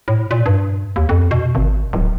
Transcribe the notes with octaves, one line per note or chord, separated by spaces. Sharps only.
A2
A#2
G2
D#2
F2
B2
G#1
D1